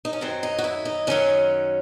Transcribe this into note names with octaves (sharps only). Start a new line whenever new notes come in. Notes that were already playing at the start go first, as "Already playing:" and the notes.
D#4
C#4
F#2 D#3 F#3 C4
D#4
F#4
E4
D#4
F#2 D#3 F#3 C#4